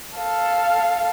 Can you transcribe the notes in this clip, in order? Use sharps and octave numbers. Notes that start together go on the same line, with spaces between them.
A4 F5